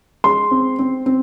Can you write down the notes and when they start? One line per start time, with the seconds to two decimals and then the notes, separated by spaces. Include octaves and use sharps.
0.24 G#3 C6
0.51 C4
0.79 C4
1.06 C4